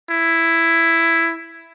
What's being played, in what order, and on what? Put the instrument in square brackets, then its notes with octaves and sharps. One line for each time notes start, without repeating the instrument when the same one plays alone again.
[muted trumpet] E4